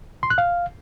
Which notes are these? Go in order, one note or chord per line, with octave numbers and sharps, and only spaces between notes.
C6
F#6
F5